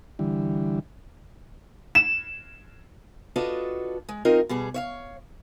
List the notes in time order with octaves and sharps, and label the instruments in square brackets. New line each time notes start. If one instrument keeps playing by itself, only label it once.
[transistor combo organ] D3 E3 G3
[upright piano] E7
[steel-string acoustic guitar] D4 F4 F#4 A4 B4 D#5
G#3
F#3 C4 D#4 F4 A#4 D#5
B2 G3 G#4
C#5 E5 F5